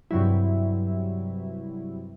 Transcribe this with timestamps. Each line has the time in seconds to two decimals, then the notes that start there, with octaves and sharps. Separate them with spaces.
0.11 G2 C3 F#3 E4